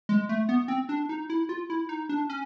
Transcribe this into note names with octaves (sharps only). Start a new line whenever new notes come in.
G#3
A3
B3
C4
D4
D#4
E4
F4
E4
D#4
D4
C#4